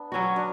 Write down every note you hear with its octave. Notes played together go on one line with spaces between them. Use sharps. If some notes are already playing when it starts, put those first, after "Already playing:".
Already playing: B3 D4
F#3 C#4 F#4
D4